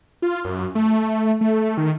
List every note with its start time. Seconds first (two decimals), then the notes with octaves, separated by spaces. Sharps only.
0.22 F4
0.45 F#2
0.75 A3
1.41 A3
1.78 D#3